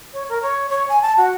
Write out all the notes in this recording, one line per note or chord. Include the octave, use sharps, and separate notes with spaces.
C#5
A#4
C#5
C#5
G#5
A5
F#4